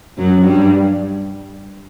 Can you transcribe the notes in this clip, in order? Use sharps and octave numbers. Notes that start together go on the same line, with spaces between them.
F#2 F#3
G2 G3